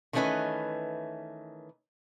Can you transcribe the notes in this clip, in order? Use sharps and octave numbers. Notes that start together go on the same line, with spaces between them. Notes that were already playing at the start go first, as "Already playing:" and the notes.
D#3 E3 A3 C#4 B4 D#5